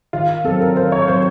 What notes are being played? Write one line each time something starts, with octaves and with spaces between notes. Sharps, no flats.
D#3 F4
F#3 C4 A4
A#4
D#3 C5
C#5
F#3 C4 C5